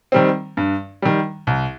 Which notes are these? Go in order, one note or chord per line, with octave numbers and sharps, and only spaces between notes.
D#3 G3 C4
G2
D#3 G3
C2